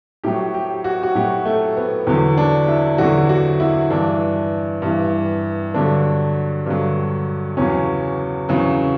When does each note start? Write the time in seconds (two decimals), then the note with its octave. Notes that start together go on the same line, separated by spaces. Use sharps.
0.24 A2 F#3 G4
0.54 G4
0.84 F#4
1.03 F#4
1.15 A2 F#3 G4
1.45 A3
1.77 B3
2.07 E2 D3 F#3
2.38 D4
2.68 E4
2.98 E2 D3 F#3 F#4
3.29 F#4
3.60 E4
3.90 G2 E3 D4
4.82 G2 E3
5.74 G2 D3 F#3 D4
6.66 G2 D3 F#3
7.57 E2 C#3 F#3 C#4
8.49 E2 C#3 F#3